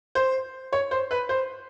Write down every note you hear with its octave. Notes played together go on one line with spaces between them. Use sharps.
C5
C#5
C5
B4
C5